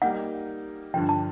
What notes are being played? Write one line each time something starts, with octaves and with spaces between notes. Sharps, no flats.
G3 A#3 D#4 F#5
G2 D3 F3 G5
A5